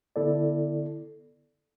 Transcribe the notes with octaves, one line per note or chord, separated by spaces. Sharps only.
D3 B3 E4 A4 D5